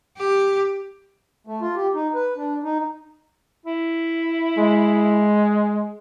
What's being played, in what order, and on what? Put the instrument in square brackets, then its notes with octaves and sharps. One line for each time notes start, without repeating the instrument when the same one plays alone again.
[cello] G4
[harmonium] A3
F4
G4
D#4
B4
D4
D#4
[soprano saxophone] E4
[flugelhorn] G#3